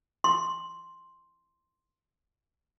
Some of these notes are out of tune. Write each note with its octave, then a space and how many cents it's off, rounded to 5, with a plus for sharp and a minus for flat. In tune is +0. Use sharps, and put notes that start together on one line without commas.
C6 +5